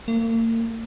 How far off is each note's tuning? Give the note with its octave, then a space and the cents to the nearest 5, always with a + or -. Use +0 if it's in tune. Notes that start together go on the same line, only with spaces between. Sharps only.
A#3 -40